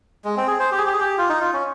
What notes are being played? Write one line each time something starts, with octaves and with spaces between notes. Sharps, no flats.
G#3
C4
G#4
C5
G4
G#4
G4
G#4
G4
F4
D#4
F4
C#4